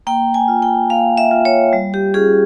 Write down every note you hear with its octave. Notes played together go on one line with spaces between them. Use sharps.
A#3 G5
G#5
F4
G5
A#3 F5
E5
F4
C#5
G3
G4
C#4 F4 G#4